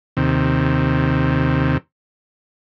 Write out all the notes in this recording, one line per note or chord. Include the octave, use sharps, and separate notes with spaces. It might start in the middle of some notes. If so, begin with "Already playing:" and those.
D#2 C3